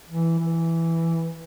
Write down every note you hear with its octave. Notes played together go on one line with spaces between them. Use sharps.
E3
E3